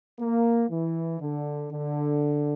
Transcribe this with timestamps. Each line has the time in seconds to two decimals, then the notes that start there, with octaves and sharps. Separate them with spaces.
0.19 A#3
0.69 E3
1.20 D3
1.72 D3